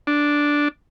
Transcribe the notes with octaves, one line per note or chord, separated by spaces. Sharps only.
D4